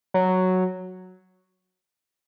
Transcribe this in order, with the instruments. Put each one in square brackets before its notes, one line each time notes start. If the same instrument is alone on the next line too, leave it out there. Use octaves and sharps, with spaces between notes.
[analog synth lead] F#3